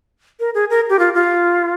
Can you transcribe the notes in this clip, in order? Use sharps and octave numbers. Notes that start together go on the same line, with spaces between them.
A#4
G#4
A#4
G4
F4
F4